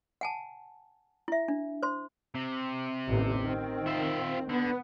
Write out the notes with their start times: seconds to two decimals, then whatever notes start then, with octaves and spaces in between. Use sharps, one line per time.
0.21 F#5 G#5 A5
1.28 E4 E5
1.48 D4
1.83 C5 C6
2.35 C3
3.08 A1 D#2
3.42 D#3 C4
3.87 F4 E5
4.49 D3 B3